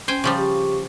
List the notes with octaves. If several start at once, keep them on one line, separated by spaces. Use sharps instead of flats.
C#4 C5 G5 G#5
C#3 F3 G3
G4 C#6